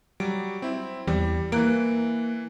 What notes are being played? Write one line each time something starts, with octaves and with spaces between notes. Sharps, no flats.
F#3 G3 D7
C4 E4
E2 G3
E3 A#3 F#6 D7